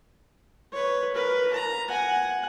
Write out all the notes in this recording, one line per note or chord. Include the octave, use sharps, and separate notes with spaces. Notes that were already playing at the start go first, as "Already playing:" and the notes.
B4 C#5
A#4 B4
A#5
F#5 G#5